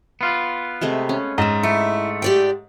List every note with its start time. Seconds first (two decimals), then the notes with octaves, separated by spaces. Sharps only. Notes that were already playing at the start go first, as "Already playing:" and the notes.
0.21 B3 F4
0.82 C3 G#3 A3
1.09 C#4
1.38 G#2 D#5 E5
1.63 A3 E4
2.22 G4 D5 G5